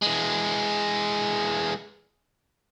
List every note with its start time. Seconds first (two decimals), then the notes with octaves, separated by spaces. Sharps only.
0.02 E3 G#3